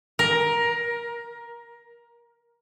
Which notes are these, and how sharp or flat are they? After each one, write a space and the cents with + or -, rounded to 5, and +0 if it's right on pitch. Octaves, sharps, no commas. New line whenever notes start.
A#4 +15